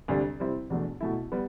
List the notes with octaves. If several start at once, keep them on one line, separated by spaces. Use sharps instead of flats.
D2 C3 G3 D4
C3 G3 C4 E4
E2 B2 A3 D4
B2 A3 E4
G3 B3